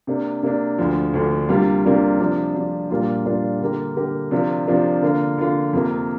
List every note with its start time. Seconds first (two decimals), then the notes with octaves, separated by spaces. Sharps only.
0.07 C3 A#3 D4
0.43 C3 A#3 D4
0.79 D2 D3 F3
1.13 D2 D3 F3
1.49 C3 G3 A#3 D4 F4
1.84 C3 G3 A#3 D4 F4
2.19 C3 F3 D4
2.54 C3 F3 D4
2.90 A#2 G3 A#3 D4 F4
3.26 A#2 G3 A#3 D4 F4
3.61 D3 A#3 G4 A#4
3.96 D3 A#3 G4 A#4
4.31 C3 F3 D4 F4 A#4
4.67 C3 F3 D4 F4 A#4
5.03 D3 A#3 F4
5.38 D3 A#3 F4
5.73 F2 C3 F3 A#3